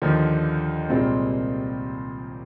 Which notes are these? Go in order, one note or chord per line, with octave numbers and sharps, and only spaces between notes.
D#2 D3 F3
C2 A#2 G#3 C4 F4